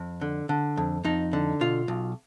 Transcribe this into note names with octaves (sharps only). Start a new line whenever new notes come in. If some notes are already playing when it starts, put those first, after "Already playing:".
Already playing: F2
D3
D3
F2
F2 D#4
D3
B2 F4
B1